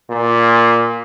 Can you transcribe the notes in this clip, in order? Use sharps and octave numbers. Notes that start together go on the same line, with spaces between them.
A#2